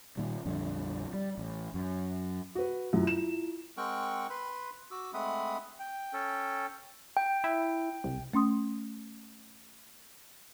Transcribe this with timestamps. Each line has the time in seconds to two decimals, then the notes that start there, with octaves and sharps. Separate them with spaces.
0.17 A#2 D#3 G3
0.45 A#1 F2 D3 G3
1.13 G3
1.38 A1
1.74 F#2
2.55 F#4 B4
2.93 F#2 E4 F4
3.07 E7
3.77 G#3 C4 A#4 F#5 G5 C#6
4.30 B4 B5 C6
4.91 F#4 D6 E6
5.14 G#3 A3 C4 F#5 B5 D#6
5.80 G5
6.13 C#4 A4
7.17 G5
7.44 E4
8.04 C2
8.33 A3 C#4 C6 D#6